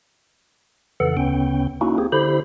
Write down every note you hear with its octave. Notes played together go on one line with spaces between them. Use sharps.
F2 C#3 E3 A4 F#5
D2 C#3 B3 C#4 G5
A#3 C#4 D#4 E4 F#4
A#3 C4 G4 G#4
D3 E4 G4 C5 B5